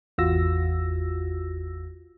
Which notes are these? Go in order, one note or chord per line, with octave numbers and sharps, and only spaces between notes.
G#1 E2 F4 F#4 E6 A#6